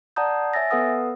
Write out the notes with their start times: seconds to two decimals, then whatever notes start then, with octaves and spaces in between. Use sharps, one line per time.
0.16 D5 F#5 A5 A#5 D#6 G6
0.53 C#5 E5 G#5 E6 A6 A#6
0.70 B3 A4 B4 F#5 D#6 E6